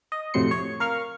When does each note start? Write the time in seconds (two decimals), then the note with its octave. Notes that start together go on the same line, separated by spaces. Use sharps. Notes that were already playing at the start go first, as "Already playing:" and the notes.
0.12 D#5
0.34 F2 A2 C3 F#3 C6 C#7
0.51 C#5
0.80 A#4 F5 C#6 F6